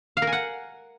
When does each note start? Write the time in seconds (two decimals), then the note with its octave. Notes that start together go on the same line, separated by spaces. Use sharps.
0.17 F5
0.22 A#4
0.27 G#5
0.32 F#5